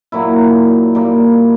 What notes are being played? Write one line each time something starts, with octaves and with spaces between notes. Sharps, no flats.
A#2 F#3 A#3 E4
A#2 G3 A#3